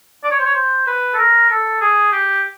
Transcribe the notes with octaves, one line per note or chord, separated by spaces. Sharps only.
D5
C#5
C5
C#5
C5
B4
A4
A#4
A4
G#4
G4